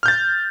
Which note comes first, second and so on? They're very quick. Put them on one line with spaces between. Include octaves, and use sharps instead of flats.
F6 G6 A6